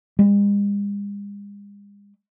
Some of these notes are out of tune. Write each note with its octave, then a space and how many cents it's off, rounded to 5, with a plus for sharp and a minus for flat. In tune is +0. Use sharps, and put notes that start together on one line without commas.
G#3 -45